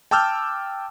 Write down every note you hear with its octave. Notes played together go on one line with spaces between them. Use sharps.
G5 A5 D6 E6 F6 G6